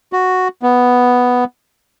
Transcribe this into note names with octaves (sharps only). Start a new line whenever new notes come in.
F#4
B3